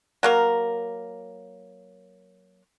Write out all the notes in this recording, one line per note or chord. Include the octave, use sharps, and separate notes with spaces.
F#3 A#3 A#4